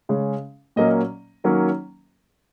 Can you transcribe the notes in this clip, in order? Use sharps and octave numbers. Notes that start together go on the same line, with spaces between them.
C#3 G#3 C#4
A#2 F#3 A#3 C#4 D#5
D#3 F#3 A#3 C#4